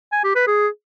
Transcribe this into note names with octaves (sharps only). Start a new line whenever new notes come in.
G#5
G4
B4
G#4